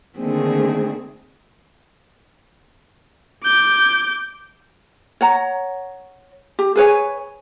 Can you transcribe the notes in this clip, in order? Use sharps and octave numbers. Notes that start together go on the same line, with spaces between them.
D3 D#3 A3 A#3 C4 G#4
D6 G6
C#5 F#5 A#5
G4
G#4 B4 C#5 G#5